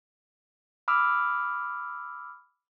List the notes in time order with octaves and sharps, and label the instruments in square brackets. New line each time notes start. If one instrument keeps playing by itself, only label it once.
[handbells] B5 D6 E6 F6